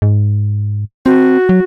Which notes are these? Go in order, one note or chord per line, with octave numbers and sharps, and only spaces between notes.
G#2
C4 F#4
F#3